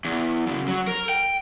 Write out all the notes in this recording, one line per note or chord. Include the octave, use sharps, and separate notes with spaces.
E2
F#2 C#3
F#3
A#4
G5